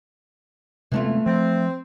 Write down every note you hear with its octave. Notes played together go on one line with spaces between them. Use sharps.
C3 E3 G#3 A3 B3 F4
F3 C4